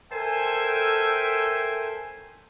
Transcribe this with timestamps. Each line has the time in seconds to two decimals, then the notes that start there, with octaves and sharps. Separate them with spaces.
0.12 A4 A#4 C5 E5 G5 G#5